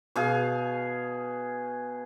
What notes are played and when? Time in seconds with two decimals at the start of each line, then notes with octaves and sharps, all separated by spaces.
0.16 B2 G#4 F5